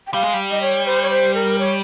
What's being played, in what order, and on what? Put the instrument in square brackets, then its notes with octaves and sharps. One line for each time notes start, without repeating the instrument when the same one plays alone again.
[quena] G5
[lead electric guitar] G3 [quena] F5
[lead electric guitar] G#3
G3
[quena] D#5
C#5
C5
C#5
C5
A#4
C#5